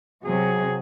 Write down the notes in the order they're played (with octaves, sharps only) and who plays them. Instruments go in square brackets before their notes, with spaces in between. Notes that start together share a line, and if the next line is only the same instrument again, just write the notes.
[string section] C3 F#3 [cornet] G#4